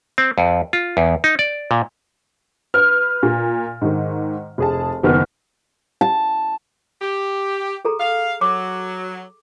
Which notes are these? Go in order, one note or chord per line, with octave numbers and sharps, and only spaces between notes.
C4
F2
F4
E2
D#4
D5
A#2
B4 F6
A#2
G#2 D#3
F1 G#4 A5
F#1 D#3 B3 F6
A5
G4
G#4 A4 A#5
F5
F#3 D6